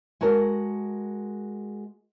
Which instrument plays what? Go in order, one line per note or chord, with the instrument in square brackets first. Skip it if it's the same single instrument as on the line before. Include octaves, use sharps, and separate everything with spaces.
[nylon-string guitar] G#3 F#4 A4 A#4